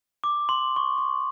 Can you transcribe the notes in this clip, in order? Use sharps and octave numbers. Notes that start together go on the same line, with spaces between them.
D6
C6
C#6
C6